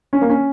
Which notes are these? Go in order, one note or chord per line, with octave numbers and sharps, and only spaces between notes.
C#4
A#3
C#4